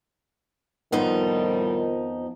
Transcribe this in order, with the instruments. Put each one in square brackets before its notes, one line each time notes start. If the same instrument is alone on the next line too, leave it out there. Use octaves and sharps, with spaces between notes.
[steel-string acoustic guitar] F2 F3 D#4 [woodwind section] A2 G3 [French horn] D#3 [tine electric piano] B3